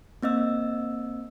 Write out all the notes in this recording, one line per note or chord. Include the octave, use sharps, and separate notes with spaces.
A#3 C4 D#5 E6